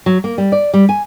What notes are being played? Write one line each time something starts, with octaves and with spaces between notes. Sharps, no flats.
F#3
A#3
G3
D5
G3
G#5